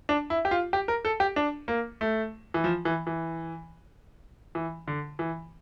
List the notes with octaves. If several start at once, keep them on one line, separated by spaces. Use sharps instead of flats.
D4
E4
G4
F4
G4
A#4
A4
G4
D4
A#3
A3
E3
F3
E3
E3
E3
D3
E3